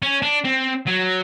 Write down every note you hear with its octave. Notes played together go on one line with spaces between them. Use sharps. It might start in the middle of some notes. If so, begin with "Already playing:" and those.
C#4
D4
C4
F#3